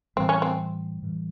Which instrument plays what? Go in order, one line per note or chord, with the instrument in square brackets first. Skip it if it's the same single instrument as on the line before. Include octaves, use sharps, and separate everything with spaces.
[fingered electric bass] A2 E3 G3 [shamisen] C4
[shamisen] C#4
C4
[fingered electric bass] A2 E3 G3